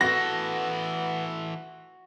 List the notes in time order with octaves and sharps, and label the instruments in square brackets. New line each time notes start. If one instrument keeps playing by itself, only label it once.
[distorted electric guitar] E3 A4 [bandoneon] B3 [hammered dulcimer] F#4 [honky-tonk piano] A#6